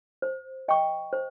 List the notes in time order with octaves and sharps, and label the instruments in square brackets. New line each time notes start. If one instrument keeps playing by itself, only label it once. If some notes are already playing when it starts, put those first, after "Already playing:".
[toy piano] C5
D#5 G5 C#6
C5